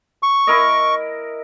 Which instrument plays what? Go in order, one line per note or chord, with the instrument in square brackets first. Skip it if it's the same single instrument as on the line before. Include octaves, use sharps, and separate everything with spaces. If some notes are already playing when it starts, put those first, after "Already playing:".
[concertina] C#6
[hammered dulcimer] E4 A#4 D#5